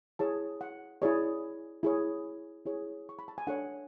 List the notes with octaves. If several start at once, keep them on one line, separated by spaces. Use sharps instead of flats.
E4 G#4 C#5 A5
F#5
E4 G#4 C#5 D5
E4 G#4 C#5
E4 G#4 C#5
C#6
B5
A5
G#5
D4 A4 C#5 F#5